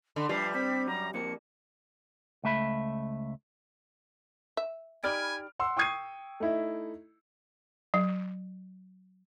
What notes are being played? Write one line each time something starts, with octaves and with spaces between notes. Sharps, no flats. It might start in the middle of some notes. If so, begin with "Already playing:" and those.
D3 B5
F3 G3 B4 C7
C4 B6
F#2 A#5
F2 A#3 C#7
C#2 A3 E5 B5
E5
D#4 G4 D5 G#5 B5 F6 D7
F#5 C6 E6
G5 C#6 D#6 G#6 C7 D#7
A3 D#4 E4 E5
F#3